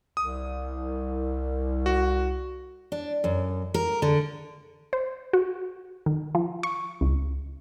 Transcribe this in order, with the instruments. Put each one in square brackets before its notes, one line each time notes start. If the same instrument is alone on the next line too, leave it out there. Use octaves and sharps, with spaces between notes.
[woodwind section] C2 [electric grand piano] D#6
[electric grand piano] F#4
[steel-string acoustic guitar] D4
F#2
A#4
D3
[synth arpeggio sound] C5
F#4
D#3
F3
C#6
C#2